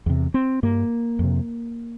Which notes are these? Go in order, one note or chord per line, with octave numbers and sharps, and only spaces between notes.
E2 C3
C4
G2 A#3
F2 C3